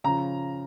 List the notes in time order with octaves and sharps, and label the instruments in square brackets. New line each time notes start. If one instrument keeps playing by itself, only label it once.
[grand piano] C#3 F3 A#5